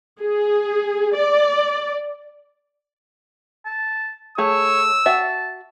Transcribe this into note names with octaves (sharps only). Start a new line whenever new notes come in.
G#4
D5
A5
A3 G#4 C#5 E6
F#4 E5 F#5 A5